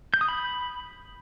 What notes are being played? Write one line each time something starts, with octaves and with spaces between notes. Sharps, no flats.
G6
D#6
B5